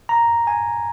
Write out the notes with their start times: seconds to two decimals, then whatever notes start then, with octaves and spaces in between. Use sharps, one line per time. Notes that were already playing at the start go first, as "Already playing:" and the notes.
0.09 A#5
0.47 G#5